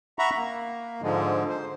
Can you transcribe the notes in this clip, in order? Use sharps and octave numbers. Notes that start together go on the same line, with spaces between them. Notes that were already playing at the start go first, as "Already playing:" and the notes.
E5 F#5 A#5 B5 C#6
A#3
G#2 D3 F3 G#3
C5